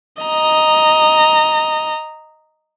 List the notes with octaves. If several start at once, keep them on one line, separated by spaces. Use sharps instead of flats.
D#5 A#5